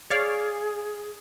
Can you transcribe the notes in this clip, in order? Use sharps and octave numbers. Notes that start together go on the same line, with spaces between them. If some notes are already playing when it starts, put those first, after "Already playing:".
G#4 C#5 D5 F5